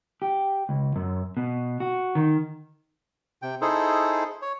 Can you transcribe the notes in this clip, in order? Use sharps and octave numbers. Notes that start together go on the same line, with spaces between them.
G4
C#2
F#2
B2
F#4
D#3
C3 G5
D#4 E4 G#4 A4 C5
C#5